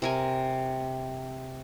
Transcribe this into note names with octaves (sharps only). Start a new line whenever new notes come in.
C3 A#4 G#5